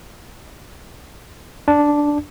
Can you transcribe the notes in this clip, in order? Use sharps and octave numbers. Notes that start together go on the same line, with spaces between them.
D4